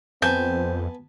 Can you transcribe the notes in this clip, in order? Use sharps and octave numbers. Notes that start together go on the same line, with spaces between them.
F2 B3 C4 G#5 A5 G6